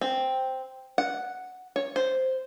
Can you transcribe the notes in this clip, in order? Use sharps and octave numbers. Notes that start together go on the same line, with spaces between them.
C4
F#5
C#5
C5